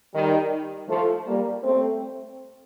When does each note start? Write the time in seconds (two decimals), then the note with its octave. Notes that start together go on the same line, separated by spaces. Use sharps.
0.14 D#3 G3
0.89 F3 A3
1.27 G3 A#3
1.63 A3 C4